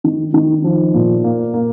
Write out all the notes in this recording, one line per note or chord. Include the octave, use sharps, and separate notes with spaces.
D#3
D#3
F3
A#2
A#3
A#3